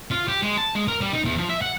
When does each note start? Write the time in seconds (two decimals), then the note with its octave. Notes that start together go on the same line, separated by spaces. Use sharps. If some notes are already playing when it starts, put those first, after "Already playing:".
0.11 F4
0.28 G4
0.42 G#3
0.58 A5
0.75 G#3
0.88 A#4
1.01 G3
1.13 D#4
1.24 E2
1.38 F3
1.49 E5
1.62 F#5